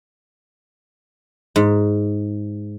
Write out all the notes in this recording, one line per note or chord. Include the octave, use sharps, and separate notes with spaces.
G#2